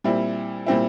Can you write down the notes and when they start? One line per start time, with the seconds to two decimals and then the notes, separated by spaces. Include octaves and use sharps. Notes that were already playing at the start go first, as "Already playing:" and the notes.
0.04 A#2 G3 C4 E4
0.66 A#2 G3 C4 E4